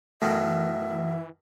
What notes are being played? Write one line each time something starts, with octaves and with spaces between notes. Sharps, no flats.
F#2 B2 D#3 E3 A3 E5